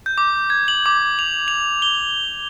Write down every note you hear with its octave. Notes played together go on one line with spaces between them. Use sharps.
G6
D6
G#6
F#7
D6
F7
F7
G7